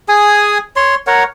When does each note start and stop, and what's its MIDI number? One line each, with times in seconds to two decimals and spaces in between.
0.09 0.58 68
0.09 0.58 80
0.09 0.58 87
0.76 0.95 73
0.76 0.95 84
1.07 1.24 70
1.07 1.24 73
1.07 1.24 78